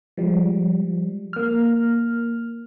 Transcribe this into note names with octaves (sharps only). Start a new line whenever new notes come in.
F3 G3 G#3
A#3 F6